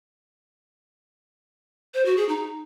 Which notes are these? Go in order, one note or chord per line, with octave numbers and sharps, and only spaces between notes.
C5
F#4
G#4
D#4